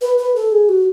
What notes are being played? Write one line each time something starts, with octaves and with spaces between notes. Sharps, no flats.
B4
B4
A4
G#4
F#4